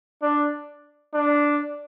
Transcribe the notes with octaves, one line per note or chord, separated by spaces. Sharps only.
D4
D4